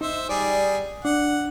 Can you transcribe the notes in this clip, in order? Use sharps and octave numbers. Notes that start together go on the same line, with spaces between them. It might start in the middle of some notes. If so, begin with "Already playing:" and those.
D#4 C5 E5
G3 G#4 D5
D4 F#5